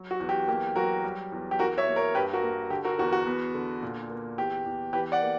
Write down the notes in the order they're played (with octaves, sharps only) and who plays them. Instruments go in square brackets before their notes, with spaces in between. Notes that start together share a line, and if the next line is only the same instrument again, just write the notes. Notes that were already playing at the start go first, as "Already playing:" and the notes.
Already playing: [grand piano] F#3
F#4
E2
G4
A#3 G4
F#3 F#4 A#4
G3
E2
G4
E2 F#4 A#4
C#5 E5
A#3
A#4 C#5
G2 G4 B4
F#4 A#4
A#3
D3 G4
F#4 A#4
E2 F#4 A#4
F#4
B3
D3
A#2
A#3
E2 G4
E2
E3 G4 B4
D5 F#5
A#3